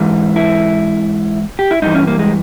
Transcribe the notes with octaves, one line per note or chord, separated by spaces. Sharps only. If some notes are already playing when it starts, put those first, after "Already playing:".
Already playing: G#2 E3
E4
G4
E4
G2 E3 D#4
C#4
A#3
G#3